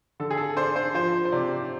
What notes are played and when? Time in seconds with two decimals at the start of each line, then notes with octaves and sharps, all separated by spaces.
0.20 D3 A4
0.31 G#4
0.37 A4
0.56 D4 C5
0.76 C5
0.94 F3 C5
1.25 C5
1.32 C3 D5